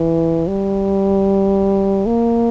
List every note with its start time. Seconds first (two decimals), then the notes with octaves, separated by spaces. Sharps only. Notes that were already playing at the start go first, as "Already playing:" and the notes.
Already playing: E3
0.47 G3
2.06 A#3